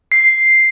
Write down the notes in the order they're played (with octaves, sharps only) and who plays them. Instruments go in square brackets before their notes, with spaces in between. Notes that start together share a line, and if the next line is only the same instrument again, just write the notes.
[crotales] C7